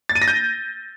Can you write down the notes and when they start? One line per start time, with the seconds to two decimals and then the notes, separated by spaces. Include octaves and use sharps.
0.09 A6
0.15 D#7
0.22 A#6
0.28 G6